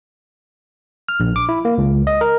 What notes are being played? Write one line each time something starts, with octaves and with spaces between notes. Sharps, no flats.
F6
A#1
D6
E4
A#3
C#2
D#5
A#4